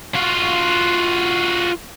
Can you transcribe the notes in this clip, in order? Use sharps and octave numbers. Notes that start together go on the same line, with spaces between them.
F4 F#4